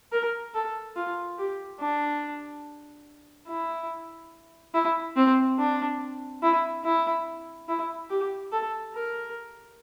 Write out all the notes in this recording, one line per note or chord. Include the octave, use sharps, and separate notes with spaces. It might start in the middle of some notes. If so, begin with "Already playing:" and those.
A#4
A4
F4
G4
D4
E4
E4
C4
D4
E4
E4
E4
G4
A4
A#4